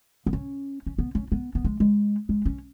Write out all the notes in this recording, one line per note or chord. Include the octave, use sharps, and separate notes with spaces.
B3
C#4
C#4
B3
C#4
B3
B3
G#3
G#3
G#3
C#4